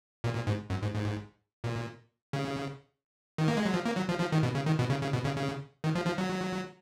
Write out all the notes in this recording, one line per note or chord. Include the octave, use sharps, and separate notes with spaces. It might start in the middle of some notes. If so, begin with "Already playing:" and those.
A#2
A#2
G#2
F#2
G#2
G#2
A#2
C#3
D#3
A#3
G#3
F#3
F3
A#3
F#3
F3
F3
D#3
B2
C#3
D#3
B2
C#3
C#3
B2
C#3
C#3
D#3
F3
F3
F#3